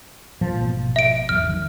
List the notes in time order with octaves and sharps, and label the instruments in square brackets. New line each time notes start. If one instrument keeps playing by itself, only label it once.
[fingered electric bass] A#2 [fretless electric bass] F3
[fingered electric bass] G#1 B2
[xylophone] E5 D7
[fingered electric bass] G#1 E2 F#3 [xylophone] F6
[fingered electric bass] D#3